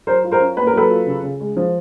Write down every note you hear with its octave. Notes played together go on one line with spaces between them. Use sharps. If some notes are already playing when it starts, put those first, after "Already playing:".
F#3 A#4 C5
F4
A#4 C5
C#4
A#3 B4
A#4
F#3 A4 B4
F4
C#3
C#3
G#3
F3